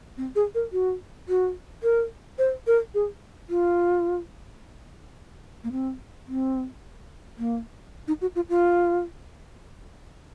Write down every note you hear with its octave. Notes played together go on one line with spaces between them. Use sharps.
C4
G#4
A#4
F#4
F#4
A#4
C5
A#4
G#4
F4
A#3
C4
C4
A#3
D#4
F#4
F4
F4